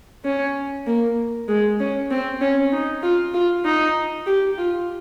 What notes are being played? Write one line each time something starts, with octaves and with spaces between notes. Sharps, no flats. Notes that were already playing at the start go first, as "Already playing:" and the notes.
C#4
A#3
G#3
C#4
C4
C#4
D#4
F4
F4
D#4
G4
F4